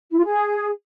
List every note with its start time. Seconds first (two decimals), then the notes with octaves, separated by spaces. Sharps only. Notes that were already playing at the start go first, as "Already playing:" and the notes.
0.11 E4
0.17 F4
0.24 G#4